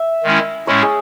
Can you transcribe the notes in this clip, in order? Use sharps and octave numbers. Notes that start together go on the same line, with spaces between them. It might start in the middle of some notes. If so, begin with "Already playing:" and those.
Already playing: E5
D#3 G#3 C#4 E4
A2 G#3 C#4 E4 C#5
G#4